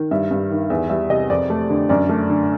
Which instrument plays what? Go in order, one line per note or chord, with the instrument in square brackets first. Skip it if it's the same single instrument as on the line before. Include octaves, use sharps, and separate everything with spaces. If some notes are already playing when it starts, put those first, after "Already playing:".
Already playing: [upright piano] D#3
G2 E5
G2
D#3
E2 E5
G3 E5
C3 D#5
F2 D5
A3
D3
F#2 D5
A3
D3